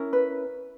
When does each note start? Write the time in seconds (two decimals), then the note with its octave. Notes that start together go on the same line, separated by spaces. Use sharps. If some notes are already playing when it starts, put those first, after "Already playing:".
Already playing: C#4 E4 A#4
0.13 B4